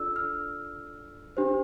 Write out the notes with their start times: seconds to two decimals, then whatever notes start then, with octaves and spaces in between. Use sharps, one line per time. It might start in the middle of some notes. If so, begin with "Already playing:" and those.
Already playing: D4 F4 A4 D5 E6
0.16 F6
1.37 D4 G4 C5